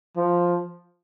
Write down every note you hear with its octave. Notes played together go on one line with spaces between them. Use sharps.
F3